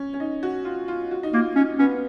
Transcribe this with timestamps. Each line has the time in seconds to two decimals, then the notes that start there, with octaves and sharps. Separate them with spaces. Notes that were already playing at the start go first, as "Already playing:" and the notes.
Already playing: C#4
0.14 C#4
0.20 D#4
0.43 F#4
0.65 F4
0.88 F4
1.11 F#4
1.23 D#4
1.33 A#3 F4
1.56 C#4 D#4
1.79 B3 C#4